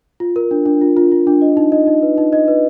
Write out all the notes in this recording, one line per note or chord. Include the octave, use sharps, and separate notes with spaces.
F4
A#4
D4
D4
F4
F4
F4
D4
D#5
D#4
D#5
D#4
B4
D#4
D#5
B4